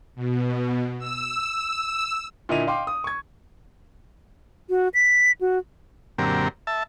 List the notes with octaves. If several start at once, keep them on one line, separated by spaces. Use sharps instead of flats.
B2
E6
A#2 D3 E4 D#5 D#7 F7
D#5 F5 G5 C6 D6
D#6
C#6 G#6
F#4
B6
F#4
F#2 A#2 D3 C4 G4 A#4
E5 A5